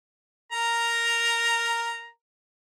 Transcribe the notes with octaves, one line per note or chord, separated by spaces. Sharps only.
A#4 A#5